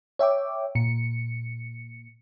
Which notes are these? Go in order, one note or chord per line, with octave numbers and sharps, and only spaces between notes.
C#5 E5 G5 D6
A#2 C#7